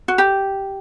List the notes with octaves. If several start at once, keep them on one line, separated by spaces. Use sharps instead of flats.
F#4
G4